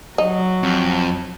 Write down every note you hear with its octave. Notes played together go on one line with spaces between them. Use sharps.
F#3 D#4
F2